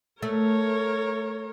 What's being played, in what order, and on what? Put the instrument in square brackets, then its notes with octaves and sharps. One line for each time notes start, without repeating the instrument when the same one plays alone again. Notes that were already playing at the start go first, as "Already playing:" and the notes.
[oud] A3 [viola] A#4 C#5